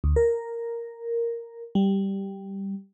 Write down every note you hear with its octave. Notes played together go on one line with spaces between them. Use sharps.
D2
A#4
G3